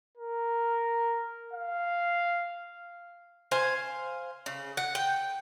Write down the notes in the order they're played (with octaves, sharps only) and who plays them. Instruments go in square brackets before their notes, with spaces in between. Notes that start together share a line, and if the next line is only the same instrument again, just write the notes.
[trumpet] A#4
F5
[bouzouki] C5 F5 G#5
C#3
F#5
G5